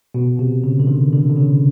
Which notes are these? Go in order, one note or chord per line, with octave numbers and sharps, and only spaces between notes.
B2
C3
C#3
D3
D#3
D3
D3
C#3